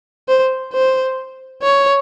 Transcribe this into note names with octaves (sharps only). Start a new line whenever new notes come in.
C5
C5
C#5